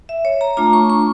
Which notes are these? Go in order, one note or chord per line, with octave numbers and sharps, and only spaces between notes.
E5
C#5
A#5
A3 D4 F4 A#5
C#6
C#6